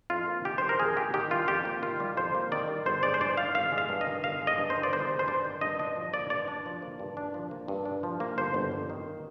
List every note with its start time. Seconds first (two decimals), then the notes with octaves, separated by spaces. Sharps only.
0.10 F2 F4
0.28 A#3
0.45 D#3 G4
0.58 G3 C5
0.69 A#4
0.80 F2 G#4
0.97 A#3 G4
1.14 D#3 G4
1.31 G3 F4
1.48 F2 G4
1.65 A#3
1.83 D#3 F4
2.00 G3
2.17 F2 C5
2.35 A#3
2.52 D#3 D5
2.69 G3
2.86 G1 C5
3.03 G#3 D5
3.14 C5
3.21 G2 D5
3.37 D#3 F5
3.55 G1 F5
3.72 G#3
3.78 F5
3.89 G2
4.01 D#5
4.07 D#3
4.24 G1 F5
4.42 G#3
4.47 D#5
4.58 G2
4.70 C5
4.76 D#3
4.83 D5
4.93 G1 C5
5.11 G#3
5.19 C5
5.27 G2 D5
5.45 D#3
5.61 G2 D#5
5.79 D4 D#5
5.96 F3
6.13 A#3 D5
6.30 G2 D5
6.48 D4
6.66 F3
6.82 A#3
6.99 G2
7.17 D4
7.34 F3
7.51 A#3
7.68 G2
7.85 D4
8.03 F3
8.20 A#3
8.38 G1 C5
8.54 G1
8.72 F2
8.90 D#3